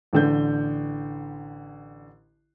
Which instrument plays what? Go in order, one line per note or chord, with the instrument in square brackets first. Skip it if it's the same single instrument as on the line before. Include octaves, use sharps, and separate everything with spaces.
[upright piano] A1 D3 G6